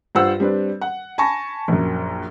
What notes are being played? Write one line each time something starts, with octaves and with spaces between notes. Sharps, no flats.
G2 F4 C5 F#5 E6
G3 C4 D4 B4
F#5
G#5 A5 B5 C#6 A#6
A#1 F#2